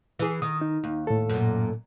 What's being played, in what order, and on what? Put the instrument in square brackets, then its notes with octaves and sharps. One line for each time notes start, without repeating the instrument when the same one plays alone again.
[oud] E3 G#4
[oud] D#3 [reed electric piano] D#6
[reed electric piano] D#4
[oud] D#2
[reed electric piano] A2 A4
[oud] F#2 A#2